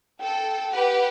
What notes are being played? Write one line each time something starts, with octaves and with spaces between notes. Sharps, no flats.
A4 G5
G4 B4 F#5